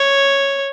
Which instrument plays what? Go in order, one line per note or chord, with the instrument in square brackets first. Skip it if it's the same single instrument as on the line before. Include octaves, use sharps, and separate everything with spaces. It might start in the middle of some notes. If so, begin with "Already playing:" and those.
Already playing: [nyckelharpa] C#5